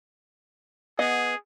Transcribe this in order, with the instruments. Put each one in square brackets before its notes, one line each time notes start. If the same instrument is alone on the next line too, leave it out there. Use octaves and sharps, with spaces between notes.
[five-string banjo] B3 D#5 F#5 [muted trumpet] G#4